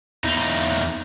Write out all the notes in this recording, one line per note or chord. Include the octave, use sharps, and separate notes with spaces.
E2 D#4